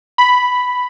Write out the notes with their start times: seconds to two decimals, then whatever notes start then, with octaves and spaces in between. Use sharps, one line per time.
0.18 B5